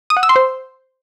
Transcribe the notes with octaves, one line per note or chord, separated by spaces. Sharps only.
D#6
F#5
E6
C6
C5